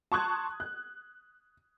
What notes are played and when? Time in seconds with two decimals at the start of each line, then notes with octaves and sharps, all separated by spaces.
0.12 A5 C6 C#6 D#6 F#6 G#6
0.60 F#6